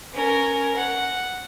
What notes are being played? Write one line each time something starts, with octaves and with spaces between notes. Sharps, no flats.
C#4 A#4
F#5